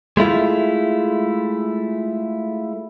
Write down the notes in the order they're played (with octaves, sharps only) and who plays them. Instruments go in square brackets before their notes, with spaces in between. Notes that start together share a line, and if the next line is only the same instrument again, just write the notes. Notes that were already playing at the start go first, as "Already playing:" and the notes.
[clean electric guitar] G#3 A3 E4 F4